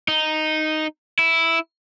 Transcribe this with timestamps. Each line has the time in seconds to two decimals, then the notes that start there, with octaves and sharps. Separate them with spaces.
0.08 D#4
1.19 E4